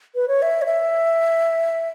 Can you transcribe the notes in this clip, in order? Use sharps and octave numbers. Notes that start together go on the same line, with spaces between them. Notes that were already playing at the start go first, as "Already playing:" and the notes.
B4
C#5
E5
C#5
E5